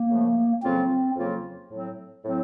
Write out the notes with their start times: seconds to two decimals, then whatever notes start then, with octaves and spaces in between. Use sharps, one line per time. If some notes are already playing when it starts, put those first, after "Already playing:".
Already playing: A#3
0.09 F#2 C#3 F3 A3
0.62 F2 C#3 F#3 A#3 C4 F4
1.16 F2 C#3 F#3 A#3 F4
1.71 A2 F#3 C4
2.24 A2 F#3 C4